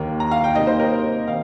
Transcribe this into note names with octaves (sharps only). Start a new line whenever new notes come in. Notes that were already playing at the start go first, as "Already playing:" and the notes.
Already playing: D#2 D#3 A#3
A#5
F5
G5
C3 G3 A#3 D#4 D#5
C5
A#4
C5
D#3 F5